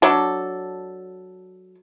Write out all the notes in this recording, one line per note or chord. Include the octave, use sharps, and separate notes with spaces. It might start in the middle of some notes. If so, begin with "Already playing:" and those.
F#3 D4 A4